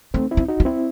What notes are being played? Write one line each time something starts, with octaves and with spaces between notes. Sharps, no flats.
A3 C4 D#4
C4 E4
D#4
D#4 F#4
B3
C4 E4